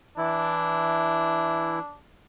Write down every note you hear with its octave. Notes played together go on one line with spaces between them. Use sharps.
E3 D4 E4